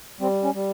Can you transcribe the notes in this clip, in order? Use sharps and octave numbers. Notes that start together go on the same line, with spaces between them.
G3 C4
C#4
G3